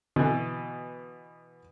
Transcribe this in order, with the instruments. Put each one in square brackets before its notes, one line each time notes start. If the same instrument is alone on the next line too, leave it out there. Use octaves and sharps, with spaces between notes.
[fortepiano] B2 E3 [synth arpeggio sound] D3